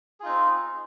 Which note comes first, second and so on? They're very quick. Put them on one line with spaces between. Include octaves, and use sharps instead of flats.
G#4 F4 D#4 C4